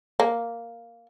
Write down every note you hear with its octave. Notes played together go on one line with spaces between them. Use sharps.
A#3